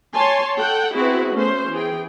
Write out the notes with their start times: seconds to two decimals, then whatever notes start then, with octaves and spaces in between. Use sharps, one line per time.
0.14 C#5 G#5 A5 C6
0.56 A4 F#5 G5
0.94 B3 C4 E4 F#4 G#4 B4
1.33 A3 B3 C#4 C5
1.70 E3 G#4 G5